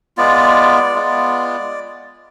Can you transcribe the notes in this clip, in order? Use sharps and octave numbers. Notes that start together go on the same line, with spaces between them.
G#3 B3 F4 D5
G#3 B3 F4